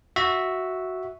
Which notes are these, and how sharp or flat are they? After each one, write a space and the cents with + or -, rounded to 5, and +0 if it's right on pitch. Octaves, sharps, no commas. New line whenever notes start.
F#4 +0 E5 -5